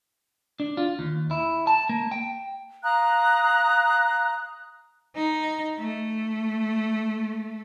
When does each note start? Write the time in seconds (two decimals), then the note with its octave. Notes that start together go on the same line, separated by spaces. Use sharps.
0.60 D4
0.77 F4
0.99 D#2
1.31 E4
1.67 A5
1.89 A#3
2.12 G5
2.83 F5 A#5 D#6 F#6
5.16 D#4
5.79 A3